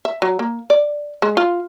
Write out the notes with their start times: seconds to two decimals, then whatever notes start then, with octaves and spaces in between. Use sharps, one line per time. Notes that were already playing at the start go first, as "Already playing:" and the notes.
0.05 E5
0.22 F#3
0.39 A#3
0.70 D5
1.22 G#3
1.37 F4